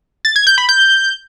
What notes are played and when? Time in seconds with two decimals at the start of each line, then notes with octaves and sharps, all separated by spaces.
0.25 A6
0.36 G#6
0.47 G6
0.58 B5
0.69 G6